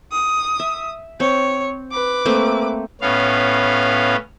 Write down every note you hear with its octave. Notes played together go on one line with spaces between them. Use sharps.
D#6
E5
C4 C#5
B4 D6
A3 A#3 C4
A2 B3 C#4 F5